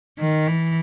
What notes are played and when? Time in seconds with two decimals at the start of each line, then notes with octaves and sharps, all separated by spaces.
0.19 D#3
0.47 E3